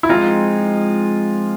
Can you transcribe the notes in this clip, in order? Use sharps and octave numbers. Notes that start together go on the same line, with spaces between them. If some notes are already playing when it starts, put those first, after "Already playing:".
E4
F3 G#3 C4 D#4 F4